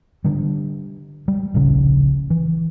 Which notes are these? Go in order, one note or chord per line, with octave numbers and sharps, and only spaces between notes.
D3 G3
G3
D1 A#1 C#3 C#4
E3